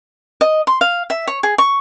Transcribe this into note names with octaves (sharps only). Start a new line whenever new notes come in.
D#5
C6
F5
E5
C#5
G#4
C#6